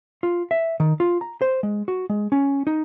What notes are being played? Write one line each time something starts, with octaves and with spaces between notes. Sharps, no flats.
F4
E5
D#3
F4
A#5
C5
G#3
F#4
G#3
C#4
D#4